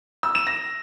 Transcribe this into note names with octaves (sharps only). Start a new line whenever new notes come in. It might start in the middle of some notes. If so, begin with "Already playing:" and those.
E6
E7
A#6